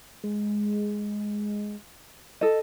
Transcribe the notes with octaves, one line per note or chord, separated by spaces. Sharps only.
G#3
A4 D#5